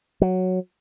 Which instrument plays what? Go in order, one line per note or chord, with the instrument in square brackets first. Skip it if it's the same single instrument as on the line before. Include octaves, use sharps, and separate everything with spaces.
[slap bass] F#3